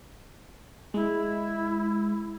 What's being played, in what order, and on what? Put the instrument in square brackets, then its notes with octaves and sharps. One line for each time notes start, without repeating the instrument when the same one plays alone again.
[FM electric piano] G#3 [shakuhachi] E4